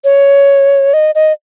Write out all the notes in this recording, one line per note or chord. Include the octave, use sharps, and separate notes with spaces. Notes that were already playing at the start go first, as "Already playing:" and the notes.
C#5
D#5
D#5